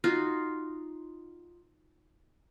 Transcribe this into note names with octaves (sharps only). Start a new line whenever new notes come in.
D#4 F4 F#4